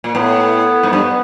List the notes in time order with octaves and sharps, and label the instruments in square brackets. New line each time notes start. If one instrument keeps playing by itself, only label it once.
[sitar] A#2
[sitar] A2 [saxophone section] B3
[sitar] G#2
G2